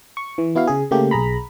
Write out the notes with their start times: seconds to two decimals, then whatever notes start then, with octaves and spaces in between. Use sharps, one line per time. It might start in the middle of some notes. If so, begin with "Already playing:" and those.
0.17 C#6
0.38 E3
0.55 B3 E4 F#4 F5
0.67 C#3 G#4
0.91 C#3 A3 A#3 G4
1.11 B1 G#4 A#5 B5